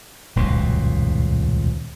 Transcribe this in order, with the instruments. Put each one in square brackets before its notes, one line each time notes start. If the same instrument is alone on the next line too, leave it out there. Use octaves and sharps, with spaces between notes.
[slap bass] D#1 C#2 F#2 B2